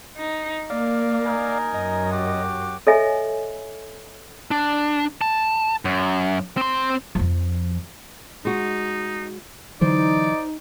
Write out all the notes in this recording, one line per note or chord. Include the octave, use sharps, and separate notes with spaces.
D#4
A#3 D5 F5
D#4 A#4 G#5
F#2 D#5
F#4 G4 D6
A4 C#5 D#5 E5 G#5
D4
A5
F#2
C4 C6
F2 F3
G#3 D#4 F#4
D3 E3 F#3 D#4 C5 D5